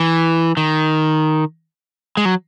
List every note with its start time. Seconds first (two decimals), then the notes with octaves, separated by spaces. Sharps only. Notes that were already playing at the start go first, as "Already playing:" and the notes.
Already playing: E3
0.57 D#3
2.17 G#3
2.25 F#3